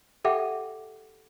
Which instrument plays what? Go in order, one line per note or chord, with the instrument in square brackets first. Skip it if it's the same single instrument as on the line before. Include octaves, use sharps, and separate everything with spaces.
[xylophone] G4 A4 E5 F#5 G5 D6